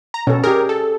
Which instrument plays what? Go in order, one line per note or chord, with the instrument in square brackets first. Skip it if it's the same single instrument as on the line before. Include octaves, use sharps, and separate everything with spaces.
[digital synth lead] A#5
[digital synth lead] B2 [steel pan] C#4 A4
[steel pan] G4 G#4 [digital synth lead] A#4
[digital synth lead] A4